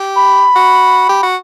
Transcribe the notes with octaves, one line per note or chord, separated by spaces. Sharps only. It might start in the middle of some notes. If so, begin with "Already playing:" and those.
Already playing: G4
B5
F#4
G4
F#4